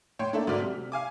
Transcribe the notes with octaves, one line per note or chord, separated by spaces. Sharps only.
A2 C#5 G5 C6
A3 A#3 D4 A4 E5
D2 G#2 F#3 D5 F6 B6
C3
C3
F5 G#5 D6